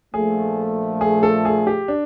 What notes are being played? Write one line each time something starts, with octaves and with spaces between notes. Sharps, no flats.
A#1 A#2 F3 A3 G#4
G#4
A4
G#4
G4
D4